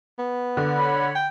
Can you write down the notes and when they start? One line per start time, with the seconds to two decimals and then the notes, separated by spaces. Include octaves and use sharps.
0.19 B3
0.57 D3
0.76 C#5 B5
1.15 G5